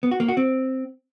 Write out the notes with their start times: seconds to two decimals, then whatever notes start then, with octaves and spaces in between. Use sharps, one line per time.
0.03 B3
0.11 F#4
0.20 A#3
0.28 F#4
0.37 C4